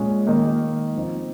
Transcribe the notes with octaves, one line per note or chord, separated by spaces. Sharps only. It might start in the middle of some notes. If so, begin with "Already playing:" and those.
Already playing: A#2 G#3 C#4
D#3 A#3 D#4
F3 C4 D#4